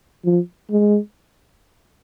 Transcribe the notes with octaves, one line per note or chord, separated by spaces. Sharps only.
F3
G#3